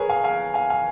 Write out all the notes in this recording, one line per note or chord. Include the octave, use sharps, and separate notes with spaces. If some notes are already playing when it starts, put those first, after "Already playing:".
Already playing: G#4 A#4 B4 C#5
F5 G#5
F5 G#5
F5 G#5
F5 G#5